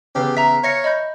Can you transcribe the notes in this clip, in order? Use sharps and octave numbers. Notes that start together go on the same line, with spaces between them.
E2 C#3 G4
E5 A#5 B6
C#5 E5 F5 A#6 C#7
D#5 B5 G6